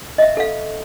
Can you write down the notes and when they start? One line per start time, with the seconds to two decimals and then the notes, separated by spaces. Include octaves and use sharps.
0.18 D#5 E5
0.37 A4 F5